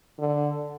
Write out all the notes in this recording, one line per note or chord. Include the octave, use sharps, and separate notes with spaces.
D3